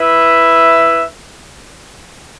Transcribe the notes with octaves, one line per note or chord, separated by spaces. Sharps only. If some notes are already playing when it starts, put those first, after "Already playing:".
Already playing: E4 B4 E5